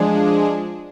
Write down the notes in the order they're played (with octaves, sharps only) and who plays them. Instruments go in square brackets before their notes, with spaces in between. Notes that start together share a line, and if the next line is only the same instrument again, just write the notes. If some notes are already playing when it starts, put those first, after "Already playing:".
Already playing: [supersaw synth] F3 G#3 D4 G#4